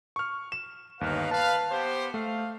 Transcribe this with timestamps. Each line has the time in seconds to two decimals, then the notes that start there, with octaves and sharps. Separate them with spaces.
0.16 C#6 F6
0.52 E7
1.01 G1 D#2 D#4 B4 F5
1.31 B4 F5 A5
1.70 B3 G4 C5
2.14 A3 F5